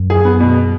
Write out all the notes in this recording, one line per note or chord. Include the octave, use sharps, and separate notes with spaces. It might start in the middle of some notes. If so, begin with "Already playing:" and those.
Already playing: F#2
G#4
B3
B2